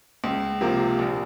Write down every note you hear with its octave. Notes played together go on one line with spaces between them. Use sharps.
C#2
C3 F3 A#3
A#1